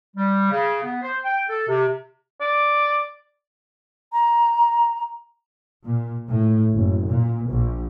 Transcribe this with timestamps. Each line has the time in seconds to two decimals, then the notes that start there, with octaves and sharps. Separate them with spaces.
0.16 G3
0.51 C#3
0.84 B3
1.02 C5
1.25 G5
1.49 A4
1.68 C3
2.40 D5
4.13 A#5
5.85 A#2
6.28 A2
6.74 F#1
7.08 A#2
7.49 A#1